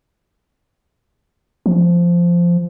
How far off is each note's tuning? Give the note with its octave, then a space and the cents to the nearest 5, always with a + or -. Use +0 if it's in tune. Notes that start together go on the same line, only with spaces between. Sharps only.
F3 -10